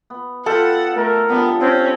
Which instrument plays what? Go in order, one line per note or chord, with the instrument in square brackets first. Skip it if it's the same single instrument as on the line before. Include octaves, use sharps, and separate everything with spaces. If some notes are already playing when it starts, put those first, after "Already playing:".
[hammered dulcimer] B3
[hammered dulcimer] F4 G5 B5 [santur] A4 [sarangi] F#5
[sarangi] A3 [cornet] A#4
[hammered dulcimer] D3 F3 G3 [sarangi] B3
[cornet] C4 [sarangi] C#4 [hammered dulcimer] C#5